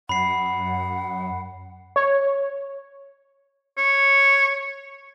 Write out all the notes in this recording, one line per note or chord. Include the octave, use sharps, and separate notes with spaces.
F#2 F#5 B5 C7
C#5
C#5